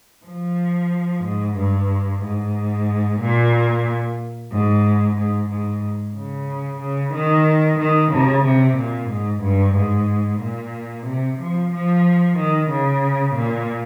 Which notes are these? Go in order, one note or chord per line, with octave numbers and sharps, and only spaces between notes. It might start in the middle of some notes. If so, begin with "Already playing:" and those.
F3
G#2
G2
G#2
A#2
G#2
G#2
G#2
C#3
C#3
D#3
D#3
C#3
C3
A#2
G#2
G2
G#2
A#2
C3
F3
F3
D#3
C#3
A#2